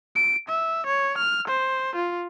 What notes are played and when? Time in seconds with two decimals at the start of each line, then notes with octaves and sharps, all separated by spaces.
0.16 D7
0.49 E5
0.87 C#5
1.18 F6
1.48 C5
1.96 F4